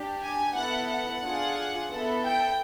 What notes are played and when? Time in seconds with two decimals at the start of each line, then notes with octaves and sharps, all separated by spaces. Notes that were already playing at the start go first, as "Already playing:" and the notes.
Already playing: D4 G4
0.22 G#5
0.56 B3 E4 A4 F#5
0.90 F#5
1.22 D4 F4 G#4
1.90 B3 E4 A4
2.24 G5